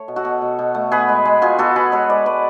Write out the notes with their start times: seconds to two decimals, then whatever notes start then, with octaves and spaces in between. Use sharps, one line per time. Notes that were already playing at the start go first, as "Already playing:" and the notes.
Already playing: A3 C#5
0.08 B2
0.16 F#4 A4
0.25 B2
0.42 B2
0.59 B2
0.75 A3
0.92 B3 G#4 B4
1.09 G#3
1.25 G#3
1.42 B2 F4 G#4
1.58 B3 F#4 A4
1.75 B3 G#4 B4
1.92 G#3 A4 C#5
2.09 G#3 B4 D5
2.26 G#3 B4 D5